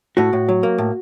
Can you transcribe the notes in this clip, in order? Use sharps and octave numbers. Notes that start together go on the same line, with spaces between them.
A2 F#4
A2
F#3
A#3
A2